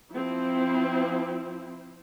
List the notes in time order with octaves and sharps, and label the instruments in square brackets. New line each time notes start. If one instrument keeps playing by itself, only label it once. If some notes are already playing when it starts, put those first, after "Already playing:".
[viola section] F3 C4 E4